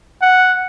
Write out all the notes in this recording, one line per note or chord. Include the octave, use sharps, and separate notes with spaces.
F#5